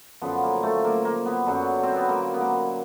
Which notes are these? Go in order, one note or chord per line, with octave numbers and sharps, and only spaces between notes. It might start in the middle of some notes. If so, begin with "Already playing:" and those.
F#2 D3 F3 B3
A#3
A3
A#3
A#3
B3
F#2 D3 F#3
C4
B3
A#3
B3
A#3